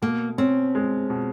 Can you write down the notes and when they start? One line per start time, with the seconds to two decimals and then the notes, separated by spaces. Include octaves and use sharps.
0.02 B2 A#3
0.38 C4 C#4
0.75 G#3
1.10 B2